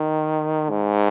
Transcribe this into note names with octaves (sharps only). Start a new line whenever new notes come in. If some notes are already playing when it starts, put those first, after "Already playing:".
Already playing: D#3
G#2